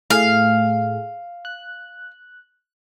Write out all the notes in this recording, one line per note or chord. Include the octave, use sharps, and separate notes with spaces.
A2 A3 G#4 F5
F#6